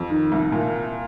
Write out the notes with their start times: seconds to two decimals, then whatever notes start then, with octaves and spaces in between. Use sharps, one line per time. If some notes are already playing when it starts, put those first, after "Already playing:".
Already playing: F2
0.10 D#3
0.32 C2
0.52 A#2